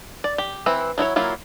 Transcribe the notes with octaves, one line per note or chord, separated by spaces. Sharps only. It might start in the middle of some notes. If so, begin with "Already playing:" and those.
D5
G4
E3 C4 E4 B4
F#3 E4 F#4 C#5
F#3 A#3 E4 F4